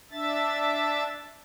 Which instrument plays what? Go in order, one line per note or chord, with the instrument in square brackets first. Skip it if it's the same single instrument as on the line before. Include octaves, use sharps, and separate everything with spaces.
[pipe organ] D4 E5 A6